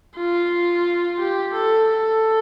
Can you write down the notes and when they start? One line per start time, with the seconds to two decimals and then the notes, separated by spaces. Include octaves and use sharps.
0.16 F4
1.19 G4
1.53 A4
1.89 A4